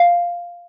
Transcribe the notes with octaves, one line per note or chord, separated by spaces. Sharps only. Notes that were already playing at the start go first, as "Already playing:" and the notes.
Already playing: F5